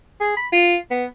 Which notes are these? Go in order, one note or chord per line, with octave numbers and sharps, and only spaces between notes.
G#4
B5
F4
B3